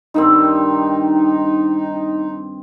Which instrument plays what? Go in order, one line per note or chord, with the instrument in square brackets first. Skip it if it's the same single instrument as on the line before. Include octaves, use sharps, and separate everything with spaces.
[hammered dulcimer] G2 D#3 C4 [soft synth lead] D#4